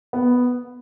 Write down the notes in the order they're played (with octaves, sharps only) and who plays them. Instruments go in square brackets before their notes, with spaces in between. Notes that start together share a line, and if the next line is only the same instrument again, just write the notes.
[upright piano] B3